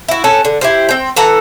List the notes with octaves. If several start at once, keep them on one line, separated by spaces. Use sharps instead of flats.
E4 F#4
C#4 A4 B4
D3
E4 G4 C5
C4 G5
E3 A4 F#5 A#5